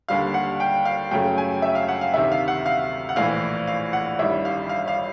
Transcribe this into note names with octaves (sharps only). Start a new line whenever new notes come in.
D#2 D3 G3 F5
F#5
G5
F5
F#2 C#3 F#3 A3 G5
G#5
E5
F5
F#5
F5
D2 C3 D#3 E5
F5
F#5
F5
F#5
A#1 A2 E3 F5
F5
F#5
A1 G2 D#3 G3 E5
F5
F5
F5